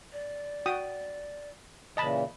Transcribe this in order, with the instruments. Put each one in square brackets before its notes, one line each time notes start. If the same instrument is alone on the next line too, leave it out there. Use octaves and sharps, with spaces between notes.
[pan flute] D5
[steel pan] F#4 G5 D#6
[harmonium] A#2 C#3 E3 [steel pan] D#5 A5 B5